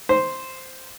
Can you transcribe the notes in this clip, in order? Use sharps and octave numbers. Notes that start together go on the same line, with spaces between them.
C5